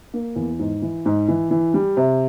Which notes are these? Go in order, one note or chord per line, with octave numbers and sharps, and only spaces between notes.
A#3
E2
G#2
E3
G#2
E3
E3
G3
C3